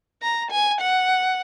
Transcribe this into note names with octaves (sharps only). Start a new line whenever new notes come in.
A#5
G#5
F#5